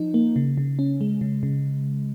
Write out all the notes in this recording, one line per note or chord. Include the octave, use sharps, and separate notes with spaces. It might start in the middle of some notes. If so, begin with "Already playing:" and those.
Already playing: F3 D#4
A#3
C#3
C#3
C#4
G#3
C#3
C#3